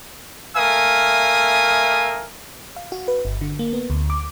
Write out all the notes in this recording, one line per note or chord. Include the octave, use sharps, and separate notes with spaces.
A3 A#4 E5 F5 G#5 D#6
F5
F#4
B4
G1
D3
A#3
B3
D2
D6